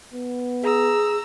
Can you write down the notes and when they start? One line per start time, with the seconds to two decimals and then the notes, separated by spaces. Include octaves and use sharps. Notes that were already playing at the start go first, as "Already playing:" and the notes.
0.14 B3
0.64 G#4 A#5 E6